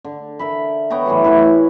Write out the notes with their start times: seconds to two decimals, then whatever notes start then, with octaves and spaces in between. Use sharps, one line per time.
0.04 D3
0.39 A#4 E5 B5
0.90 B3 C#5 G5 A#5
1.06 A2 E3 F#3 G3
1.24 E4 A#4 F#5 C#6